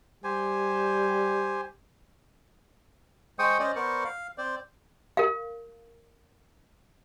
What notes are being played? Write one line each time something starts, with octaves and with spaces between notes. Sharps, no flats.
G3 G4 C5 G#5
G#3 C5 G5 C#6 D#6
C#4 C5 D5 D#5
B3 A#4 C5 D5 C#6
F5
C4 C5 D5
A#4 F5